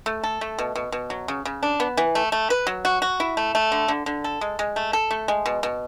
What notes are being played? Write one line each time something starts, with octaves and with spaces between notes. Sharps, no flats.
A3
A4
A3
B2
B2
B2
F#3
C#3
C#3
D4
B3
E3
A3
A3
B4
F#3
F#4
F#4
E4
A3
A3
D3
D3
D3
A4
G#3
G#3
A3
A4
A3
G#3
B2
B2